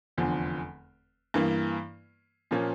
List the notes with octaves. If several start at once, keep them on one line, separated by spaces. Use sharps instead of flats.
F1 E2 D3 F3
G2 E3 A#3
A#2 F3 A#3 C#4